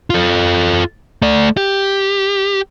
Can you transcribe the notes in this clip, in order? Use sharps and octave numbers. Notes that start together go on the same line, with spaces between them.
F4 A4
A3 D5
G4